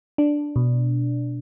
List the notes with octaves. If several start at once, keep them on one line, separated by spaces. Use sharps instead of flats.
D4
B2